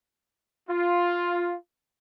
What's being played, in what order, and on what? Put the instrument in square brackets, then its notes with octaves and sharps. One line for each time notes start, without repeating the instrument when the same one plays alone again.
[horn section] F4